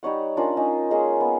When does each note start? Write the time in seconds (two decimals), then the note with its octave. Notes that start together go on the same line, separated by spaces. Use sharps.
0.03 G3 D#4 C#5 F#5
0.37 C#4 D4 F4 A#4
0.57 C#4 D#4
0.91 G#3 A#3 C#4 G#4
1.20 B3